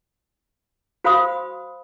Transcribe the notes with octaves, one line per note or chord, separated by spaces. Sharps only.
F#4 C5 F5 B5 C6 D#6